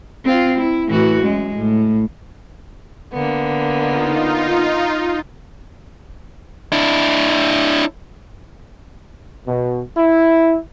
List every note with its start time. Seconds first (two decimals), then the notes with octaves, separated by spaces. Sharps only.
0.25 C4 F4
0.58 E4
0.88 A2 E3 F#4
1.22 F#2 G#3
1.55 A2
3.13 D3 A#3 B3
3.76 D#4 F4
6.72 D4 E4
9.47 B2
9.97 E4